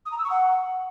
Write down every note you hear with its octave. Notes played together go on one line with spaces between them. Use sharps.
D#6
A#5
E6
C#6
F#5